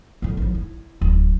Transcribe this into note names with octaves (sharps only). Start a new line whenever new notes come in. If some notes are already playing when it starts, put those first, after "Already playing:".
A#2 D3
A1 F3
E4
D1